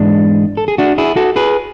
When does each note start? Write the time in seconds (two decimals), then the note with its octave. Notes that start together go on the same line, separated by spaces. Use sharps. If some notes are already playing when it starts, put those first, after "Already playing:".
Already playing: G#2 E3 G#3 B3 D4
0.57 A4
0.68 G#4
0.78 D4 F#4
0.98 E4 G#4
1.16 F#4 A4
1.36 G#4 B4